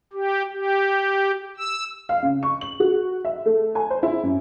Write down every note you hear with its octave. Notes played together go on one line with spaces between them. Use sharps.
G4
G4
E6
F5
C#3
C#6
F#7
F#4
E5
A3
G#5
C5
E4
F#2